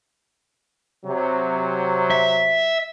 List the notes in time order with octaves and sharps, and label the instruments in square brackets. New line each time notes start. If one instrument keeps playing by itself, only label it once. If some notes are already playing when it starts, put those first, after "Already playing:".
[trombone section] C3 F#3
[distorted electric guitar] E5